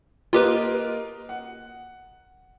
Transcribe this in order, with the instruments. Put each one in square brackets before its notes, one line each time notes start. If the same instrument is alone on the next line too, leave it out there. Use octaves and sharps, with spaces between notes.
[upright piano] A#3 A#4 D#5 [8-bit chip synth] F4 G4 B4
[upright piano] F#5